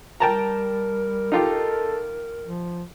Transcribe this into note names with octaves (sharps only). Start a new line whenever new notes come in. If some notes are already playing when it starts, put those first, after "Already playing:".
G3 A#4 G5 A5 A#5
D#4 F4 G4 A4
F3